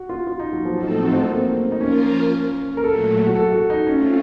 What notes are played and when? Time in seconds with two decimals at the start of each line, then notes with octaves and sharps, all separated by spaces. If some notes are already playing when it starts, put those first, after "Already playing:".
Already playing: F#4
0.09 F4
0.27 F4
0.40 D#4
0.53 F#3
0.65 F3
0.78 A2 F3 F#3 C4 D#4 A4
0.91 A3
1.04 F#4
1.17 C4
1.29 A#3
1.56 C4
1.72 D#4
1.81 F3 A#3 C#4 F4 A#4
2.77 A#4
2.84 A#2 F#3 A3 A4
3.27 F#4
3.35 A4
3.52 F#4
3.70 D#4
3.87 A3 C4 C#4 F4